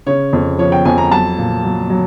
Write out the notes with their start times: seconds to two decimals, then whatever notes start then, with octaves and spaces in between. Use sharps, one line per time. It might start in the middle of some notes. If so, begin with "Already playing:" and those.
0.06 C#3 C#5
0.33 F2
0.59 F3 C#5
0.72 G5
0.85 F2 G#5
0.98 A#5
1.11 F#3 A5
1.38 A#2
1.64 F#3
1.90 F#3